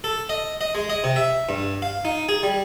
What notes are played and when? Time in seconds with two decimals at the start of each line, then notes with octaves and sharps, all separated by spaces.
0.04 A4
0.29 D#5
0.61 D#5
0.75 G#3
0.90 D#5
1.04 C3
1.16 E5
1.49 G2
1.82 F5
2.05 D#4
2.29 G#4
2.43 G3